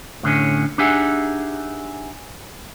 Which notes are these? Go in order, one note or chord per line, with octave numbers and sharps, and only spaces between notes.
A2 D3 C#4
D4 D#4 G4 G#4 E5 F#5